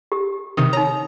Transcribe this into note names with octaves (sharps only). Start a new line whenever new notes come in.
G4
C3 D#3 D#6
D#4 C#5 A#5